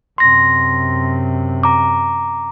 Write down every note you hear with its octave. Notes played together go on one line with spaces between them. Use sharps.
F#2 C3 C6 A#6
A#5 D6